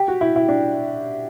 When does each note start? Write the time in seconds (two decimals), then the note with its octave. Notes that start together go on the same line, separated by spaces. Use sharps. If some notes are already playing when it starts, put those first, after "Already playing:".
Already playing: G4
0.08 F#4
0.21 E4
0.36 E4
0.49 D4